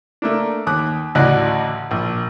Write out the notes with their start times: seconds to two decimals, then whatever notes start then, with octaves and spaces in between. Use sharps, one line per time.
0.22 A3 A#3 D4
0.67 D#2 D6 D#6 F#6
1.15 A1 D2 F#4 D5 D#5 F#6
1.91 A#1